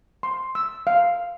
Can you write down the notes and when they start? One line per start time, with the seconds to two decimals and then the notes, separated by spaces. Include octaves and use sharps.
0.23 C6
0.55 E6
0.87 F5